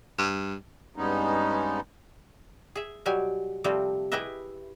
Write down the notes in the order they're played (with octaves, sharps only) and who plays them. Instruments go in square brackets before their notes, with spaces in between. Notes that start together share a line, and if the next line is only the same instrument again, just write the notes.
[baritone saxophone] G2
[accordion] G2 G3 G#3 B3 C#4 D#4
[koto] G#4 E5
B2 F#3 G3 G4 G#5
C3 F3 G3 A3 C4
E4 G4 G#4 B4 D#5 E5